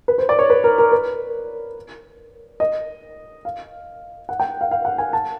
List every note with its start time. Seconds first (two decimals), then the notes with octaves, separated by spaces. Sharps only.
0.08 B4
0.18 C5
0.29 D5
0.39 C#5
0.50 B4
0.64 A#4
0.78 A#4
0.92 B4
2.60 D#5
3.45 F5
4.29 F#5
4.40 G5
4.61 F5
4.71 F5
4.85 F#5
4.98 G#5
5.13 A5